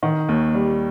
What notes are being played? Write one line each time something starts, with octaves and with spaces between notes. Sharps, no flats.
D#3
D#2
G3